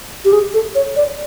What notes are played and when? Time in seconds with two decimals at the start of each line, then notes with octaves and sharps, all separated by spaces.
0.25 G4
0.33 G#4
0.54 A4
0.75 C#5
0.96 D5